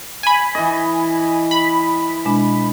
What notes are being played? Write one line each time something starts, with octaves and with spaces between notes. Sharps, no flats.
G#5 B5
E3 D#5
B5
B2 G#3 D4